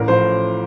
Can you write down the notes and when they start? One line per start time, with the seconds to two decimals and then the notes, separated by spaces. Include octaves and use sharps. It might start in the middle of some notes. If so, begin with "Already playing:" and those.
Already playing: A1 A#4
0.08 A2 F3 C5